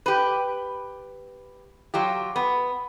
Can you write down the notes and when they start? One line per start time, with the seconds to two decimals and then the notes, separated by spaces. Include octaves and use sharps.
0.06 G4 B4
1.94 F#3 F4 G4
2.36 B3